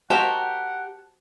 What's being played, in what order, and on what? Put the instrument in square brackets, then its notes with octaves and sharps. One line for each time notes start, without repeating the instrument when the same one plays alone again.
[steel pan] F#4 C5 D#5 [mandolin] G4 A#4 [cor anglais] F#5 [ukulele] A5